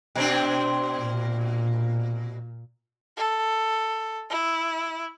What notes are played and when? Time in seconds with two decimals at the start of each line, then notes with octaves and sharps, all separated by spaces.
0.15 B2 C4 D4
0.98 A#2
3.17 A4
4.30 E4